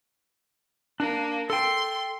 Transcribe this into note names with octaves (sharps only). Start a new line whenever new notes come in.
A#3 D4
A4 G5 C6